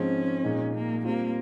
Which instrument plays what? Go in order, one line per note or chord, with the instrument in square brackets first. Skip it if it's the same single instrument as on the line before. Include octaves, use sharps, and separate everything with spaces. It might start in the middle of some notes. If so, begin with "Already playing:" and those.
Already playing: [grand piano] G#2 F3 G#3 C4 [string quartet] C#4
[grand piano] A#2 G#3 D#4
[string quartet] A#3
[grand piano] G3 C4 F4 [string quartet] A#3